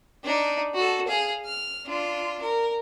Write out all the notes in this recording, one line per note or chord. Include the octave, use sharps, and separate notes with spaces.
D4 D#4
F#4 A4
G#4 F5
F6
D4 F4
A#4